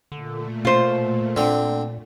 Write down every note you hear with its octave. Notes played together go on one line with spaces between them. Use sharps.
A#2 D3 A3
B2 F4 C5
A#2 D3 C4